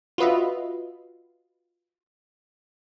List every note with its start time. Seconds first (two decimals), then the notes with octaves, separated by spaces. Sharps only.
0.18 F4 F#4 B4 D#5 E5